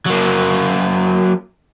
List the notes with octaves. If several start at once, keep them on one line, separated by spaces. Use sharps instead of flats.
F#3 A#3